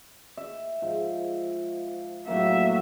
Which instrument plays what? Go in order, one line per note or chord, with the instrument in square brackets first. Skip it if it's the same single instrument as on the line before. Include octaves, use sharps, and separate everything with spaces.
[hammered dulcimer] E5
G#2 F3
[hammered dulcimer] A2 A#3 [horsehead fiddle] F#3 E5